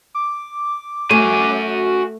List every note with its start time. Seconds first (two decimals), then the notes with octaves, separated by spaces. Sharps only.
0.15 D6
1.11 A3 F#4 G#5